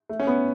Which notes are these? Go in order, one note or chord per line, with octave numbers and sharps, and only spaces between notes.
A3
C#4
B3